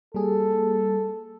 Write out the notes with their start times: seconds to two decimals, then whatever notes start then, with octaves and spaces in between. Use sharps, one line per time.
0.14 G3 A#3 G#4 A4